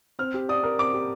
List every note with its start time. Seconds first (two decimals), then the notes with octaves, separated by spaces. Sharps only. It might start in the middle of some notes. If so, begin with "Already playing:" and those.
0.19 C4 F6
0.34 G4
0.49 D5 D#6
0.63 A#4
0.79 C4 D6
0.94 G4